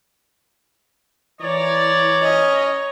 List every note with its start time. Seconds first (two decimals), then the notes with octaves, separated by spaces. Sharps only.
1.41 E3 C#5 D5 A#5
2.22 C#4 D#5